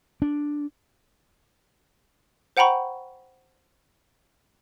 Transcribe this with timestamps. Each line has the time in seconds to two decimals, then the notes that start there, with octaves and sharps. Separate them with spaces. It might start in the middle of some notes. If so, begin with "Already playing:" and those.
0.22 D4
2.57 C5 F#5 G5 A#5 B5 C#6